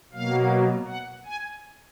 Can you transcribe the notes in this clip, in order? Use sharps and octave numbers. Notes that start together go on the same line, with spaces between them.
B2 F#3 A#3 F5
F#5
G#5